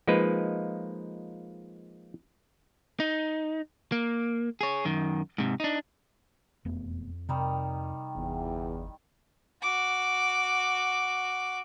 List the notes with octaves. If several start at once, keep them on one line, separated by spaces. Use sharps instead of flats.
F3 G#3 A#3 D#4 B4
D#4
A#3
G#4 C#5
F#2 D#3
G#2 C3
D4 D#4
E1 F2 A3 B3
C3 D#3 G3 D#4
G1 E2
F#4 D6